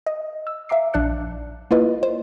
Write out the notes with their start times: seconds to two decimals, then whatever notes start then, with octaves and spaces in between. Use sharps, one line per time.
0.06 D#5
0.47 E6
0.69 E5 F5 A#5 D6 C7
0.93 A#1 D4 D5 F#6 C#7
1.71 A#3 E4 F4 B4 D#5
2.03 C5